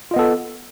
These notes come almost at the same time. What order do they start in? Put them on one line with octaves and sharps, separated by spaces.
F4 D#5 B3 A4